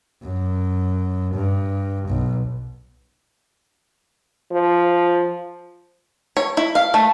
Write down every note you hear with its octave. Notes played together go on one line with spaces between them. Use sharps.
F#2
G2
B1
F3
C#5
E4
F5
A3